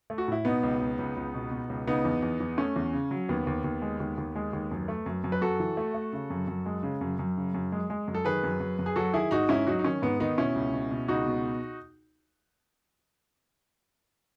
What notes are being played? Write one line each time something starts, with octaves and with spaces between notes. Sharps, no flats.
A3
F#4
A2 E4
B2 B3 D#4
C#2
C#2
C#2
C#2
B2
B2
C#2
C#3 B3 D#4
E2
E2
E2
A3 C#4
E2
C#3
F#3
D#2 B3
D#2
D#2
G#3
D#2
D#2
G#3
D#2
F#2
A3
F#2
F#2
B4
F#2 F#4 A4
E3
A3
A3
C#3
F#2
F#2
G#3
C#3
F#2
F#2
C#3
F#2
G#3
G#3
F#2
A4
D#3 G#4 B4
F#2
F#2
F#2
G#4
F#3 F#4 A4
D#3 E4 G#4
G#2 D#4 F#4
G#2 C#4 E4
F#3 D#4 F#4
D#4
D#3 C#4
G#2 B3
D#3 B3 D#4
B2 C#4 E4
C#2
B2
B2
C#2 D#4 F#4
B2